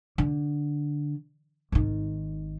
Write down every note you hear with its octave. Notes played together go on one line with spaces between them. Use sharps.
D3
G#1 D#3